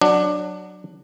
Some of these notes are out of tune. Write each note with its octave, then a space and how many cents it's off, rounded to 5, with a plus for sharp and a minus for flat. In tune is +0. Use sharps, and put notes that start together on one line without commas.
F#3 +0 D4 +15